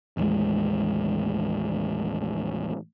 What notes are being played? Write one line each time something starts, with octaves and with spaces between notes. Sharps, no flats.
A1 D#2 G#3